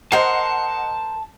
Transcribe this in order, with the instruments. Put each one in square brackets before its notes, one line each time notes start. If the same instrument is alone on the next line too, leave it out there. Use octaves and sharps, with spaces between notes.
[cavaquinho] A#4 C5 [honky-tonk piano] D#5 F#5 C7 [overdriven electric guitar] A5